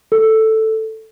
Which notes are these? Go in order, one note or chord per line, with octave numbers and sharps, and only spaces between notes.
A4